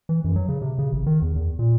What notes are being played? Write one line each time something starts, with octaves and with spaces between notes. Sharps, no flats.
E3
F#2
F#3
C#3
C3
C#3
G#1
D#3
E2
E2
A#2